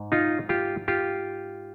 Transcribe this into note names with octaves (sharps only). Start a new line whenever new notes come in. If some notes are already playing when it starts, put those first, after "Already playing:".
Already playing: G#2
D#4 F4
F4 G4
F4 G4